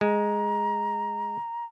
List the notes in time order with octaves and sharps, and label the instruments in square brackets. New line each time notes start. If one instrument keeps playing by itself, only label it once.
[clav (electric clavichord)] G#3 [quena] A#5